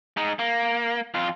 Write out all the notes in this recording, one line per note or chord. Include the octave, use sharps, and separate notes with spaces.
G#3 D#4
A#3
F2 F4